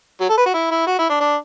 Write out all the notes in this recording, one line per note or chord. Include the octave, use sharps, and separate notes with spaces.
F#3
A4
B4
F#4
E4
E4
F#4
E4
D4
D4